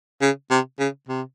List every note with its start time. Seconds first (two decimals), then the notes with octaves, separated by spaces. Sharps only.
0.21 C#3
0.50 C3
0.79 C#3
1.08 C3